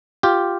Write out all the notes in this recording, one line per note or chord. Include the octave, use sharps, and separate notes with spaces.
F4 G4